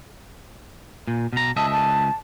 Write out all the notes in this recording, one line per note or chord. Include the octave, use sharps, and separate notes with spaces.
A#2
B2 A#5
C#2 D#5 E5 A5
A5